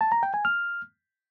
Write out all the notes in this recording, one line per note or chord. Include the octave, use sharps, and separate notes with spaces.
A5
A#5
G5
G#5
F6